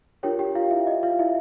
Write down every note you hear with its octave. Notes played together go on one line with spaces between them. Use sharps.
D4 F4 G4 A#4 C#5 G5
G4 G5
F4 F5
E4 E5
D#5
F4 F5
E4 E5